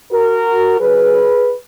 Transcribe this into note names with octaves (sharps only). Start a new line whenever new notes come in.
F#4 A#4
C#3 F#3 G#4 B4